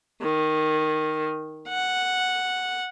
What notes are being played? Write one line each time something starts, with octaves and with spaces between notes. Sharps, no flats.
D#3
F#5